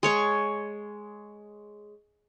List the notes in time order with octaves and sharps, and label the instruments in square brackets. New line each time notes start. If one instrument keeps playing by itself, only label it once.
[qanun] G#3 C#5 C#6